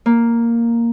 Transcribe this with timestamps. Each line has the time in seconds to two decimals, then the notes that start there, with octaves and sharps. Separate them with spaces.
0.06 A#3